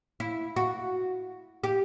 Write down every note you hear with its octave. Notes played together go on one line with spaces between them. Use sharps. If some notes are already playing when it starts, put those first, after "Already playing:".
E4
F#4
G4